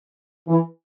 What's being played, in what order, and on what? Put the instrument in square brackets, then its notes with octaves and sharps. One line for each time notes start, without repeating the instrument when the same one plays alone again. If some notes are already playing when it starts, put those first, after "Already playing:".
[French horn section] E3